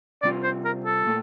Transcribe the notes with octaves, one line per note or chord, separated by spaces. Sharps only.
C3 G3 C4 F4 D5
C5
A#4
A4
A#2 A3